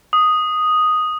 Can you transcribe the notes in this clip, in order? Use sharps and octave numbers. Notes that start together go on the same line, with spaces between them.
D#6